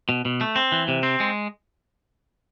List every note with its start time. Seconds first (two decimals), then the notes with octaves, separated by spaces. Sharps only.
0.09 B2
0.25 B2
0.41 A3
0.56 C4
0.72 E3
0.88 C3
1.03 C4
1.20 G#3